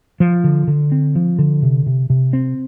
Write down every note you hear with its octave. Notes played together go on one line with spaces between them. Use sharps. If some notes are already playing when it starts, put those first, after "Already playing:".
F3
D3
D3
C4
F3
D3
C3
C3
C3
C4